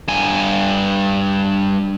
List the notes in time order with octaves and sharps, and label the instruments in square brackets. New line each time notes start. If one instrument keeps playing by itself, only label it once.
[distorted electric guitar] G2 G#5